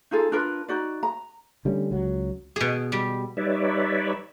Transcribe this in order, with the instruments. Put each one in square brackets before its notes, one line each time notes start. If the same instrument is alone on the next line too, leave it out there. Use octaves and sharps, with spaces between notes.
[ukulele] D#4 F4 G#4 A4
D4 F4 A#4 B4
D#4 F#4 D5
A#5
[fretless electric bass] D3 G3 A3 C#4
C#2 F#3
[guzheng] B2 G#4
G3
[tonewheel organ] G3 D#4 B4 C#5 D5 E5